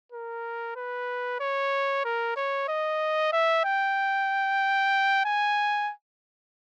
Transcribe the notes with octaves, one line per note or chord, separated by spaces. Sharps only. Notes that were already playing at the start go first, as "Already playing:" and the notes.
A#4
B4
C#5
A#4
C#5
D#5
E5
G5
G#5